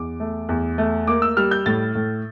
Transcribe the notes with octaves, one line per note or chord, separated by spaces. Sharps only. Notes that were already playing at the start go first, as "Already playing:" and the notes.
Already playing: E2 D6
A3
E2
A3
A#3 D6
E6
G3 F6
G6
A2 A6
A2